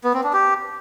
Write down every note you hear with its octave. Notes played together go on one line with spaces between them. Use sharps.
B3
C4
D4
G4